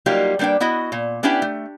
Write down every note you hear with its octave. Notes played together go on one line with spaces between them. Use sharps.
F#3 G3 A#3 D#4 F4 G4
G3 A#3 D4 B4 G5
B3 E4 F#4 D#5
A#2
B3 C#4 D4 E4 G4 G5
A3